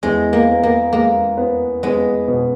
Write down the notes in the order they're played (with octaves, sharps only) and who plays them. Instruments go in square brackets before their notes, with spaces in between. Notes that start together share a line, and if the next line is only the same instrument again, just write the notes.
[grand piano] E2 [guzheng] G#3
[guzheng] A#3
[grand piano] B3
[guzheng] A#3
[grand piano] G#3 [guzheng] A#3
[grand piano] B3
[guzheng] G#3 [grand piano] B3
[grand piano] B2